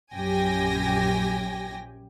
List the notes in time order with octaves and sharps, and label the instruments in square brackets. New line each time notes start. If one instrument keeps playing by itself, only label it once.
[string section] A#1 F#2 G4 G5 G#5 A#6